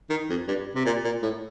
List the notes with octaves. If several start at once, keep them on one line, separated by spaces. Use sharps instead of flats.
D#3
F2
G2
C3
A#2
A#2
A2